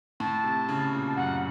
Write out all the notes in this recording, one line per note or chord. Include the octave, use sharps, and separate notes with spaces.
A2 A5
C3
C#3
A#2
A5
F#2 F#5